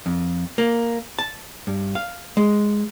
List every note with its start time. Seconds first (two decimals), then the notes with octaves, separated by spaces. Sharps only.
0.06 F2
0.58 A#3
1.19 A5
1.67 G2
1.95 F5
2.37 G#3